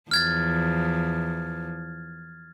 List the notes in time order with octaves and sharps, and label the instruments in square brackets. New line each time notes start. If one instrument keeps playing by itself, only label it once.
[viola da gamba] E2 F3 [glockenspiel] F6 G#6 A6